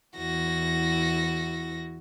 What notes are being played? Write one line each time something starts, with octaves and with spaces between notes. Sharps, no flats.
E2 E4 F#4 A#6